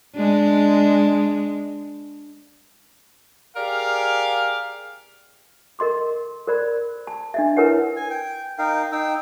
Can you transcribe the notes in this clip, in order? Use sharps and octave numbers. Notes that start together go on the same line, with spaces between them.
G#3 D4
G4 G#4 A#4 D5 F5
A#4 D#5 C6 D6
A#4 C5 D5 B5
A5
D4 D#5 E5
E4 A#4 B4 C#5 F#5 G#5
G#5
G5
D#4 A#4 F5 G5
D#4 G5 E6